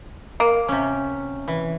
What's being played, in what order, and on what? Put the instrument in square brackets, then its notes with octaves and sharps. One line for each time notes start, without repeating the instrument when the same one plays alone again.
[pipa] A#3
[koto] C3 C#4
E3